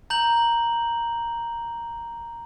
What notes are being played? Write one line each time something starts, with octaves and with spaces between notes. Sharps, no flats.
A#5 G6 F#7